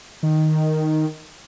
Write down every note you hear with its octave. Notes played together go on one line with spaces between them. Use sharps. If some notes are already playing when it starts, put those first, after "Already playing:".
D#3